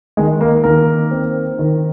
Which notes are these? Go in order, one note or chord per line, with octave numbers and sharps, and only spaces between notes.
D#3 G#3 G#4
A#3 A#4
D#3 A#3 A#4
C4
D#3